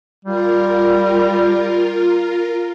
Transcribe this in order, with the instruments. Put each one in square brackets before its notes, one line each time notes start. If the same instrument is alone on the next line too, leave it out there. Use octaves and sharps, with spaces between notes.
[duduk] G3 [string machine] F4 A#4